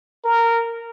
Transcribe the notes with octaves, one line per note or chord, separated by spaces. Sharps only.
A#4